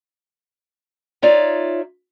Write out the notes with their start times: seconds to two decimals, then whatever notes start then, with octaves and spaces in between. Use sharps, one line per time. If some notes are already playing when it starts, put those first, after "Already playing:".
1.22 D#4 F4 C#5 D5 E5